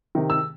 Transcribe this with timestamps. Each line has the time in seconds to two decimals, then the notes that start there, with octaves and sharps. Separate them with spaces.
0.15 C3 D#3
0.30 E6